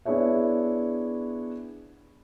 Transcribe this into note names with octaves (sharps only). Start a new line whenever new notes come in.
B3 D4 E4 G#4 C#5 E5